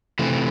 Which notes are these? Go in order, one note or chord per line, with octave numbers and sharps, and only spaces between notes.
C3 E3 A3